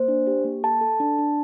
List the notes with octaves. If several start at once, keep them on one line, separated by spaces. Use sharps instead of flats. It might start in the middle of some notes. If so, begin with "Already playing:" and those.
Already playing: A#3 C5
D4
G4
A#3
A4 A5
A4
D4
D4